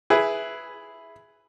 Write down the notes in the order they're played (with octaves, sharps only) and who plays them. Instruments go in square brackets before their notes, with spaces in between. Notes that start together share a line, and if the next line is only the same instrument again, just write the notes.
[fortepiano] E4 G#4 B4